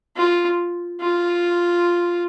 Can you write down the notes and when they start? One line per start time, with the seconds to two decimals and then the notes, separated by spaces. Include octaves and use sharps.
0.16 F4
1.01 F4